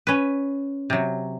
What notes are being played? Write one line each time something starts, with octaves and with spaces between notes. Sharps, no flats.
C#4 B4
C3 F#3